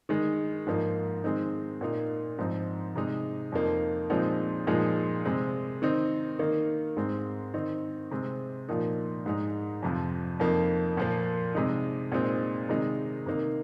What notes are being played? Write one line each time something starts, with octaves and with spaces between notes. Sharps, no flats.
D#3 G#3 D#4
G#2 F3 A#3 D#4
D#3 G#3 C4 D#4
A#2 A#3 D#4
G#2 F3 C4 D#4
C3 G#3 D#4
F2 F3 A#3 D#4
A#2 F3 G#3 C4 D#4
A#2 F3 G#3 D#4
C3 G#3 C4
D#3 C4 D#4
D#3 A#3 D#4
G#2 G#3 C4
D#3 C4 D#4
C3 G#3 C4
A#2 F3 A#3 D#4
G#2 G#3 D#4
F2 C3 F3
F2 F3 A#3 D#4
A#2 F3 A#3
C3 G#3 D#4
A#2 G#3 C4 D#4
C3 D#3 G#3 D#4
C3 D#3 A#3 D#4